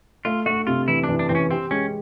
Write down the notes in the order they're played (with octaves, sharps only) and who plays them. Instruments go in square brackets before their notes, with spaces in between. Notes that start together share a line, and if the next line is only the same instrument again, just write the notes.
[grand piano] A3 [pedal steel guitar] F4
[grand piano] A3 [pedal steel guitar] F#4
[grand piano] C3 [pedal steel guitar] F4
[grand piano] E3 [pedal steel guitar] E4
[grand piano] E3 [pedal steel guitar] D4
[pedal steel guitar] D4
[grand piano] E3 [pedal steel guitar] C4
[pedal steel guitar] C#4
[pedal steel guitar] C4 [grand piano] G4
[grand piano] G#3 [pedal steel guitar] C#4